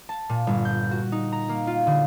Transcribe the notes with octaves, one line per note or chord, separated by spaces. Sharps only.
A5
A#2
G1
G6
F#4
D#4
A#5
A#3
F4
D3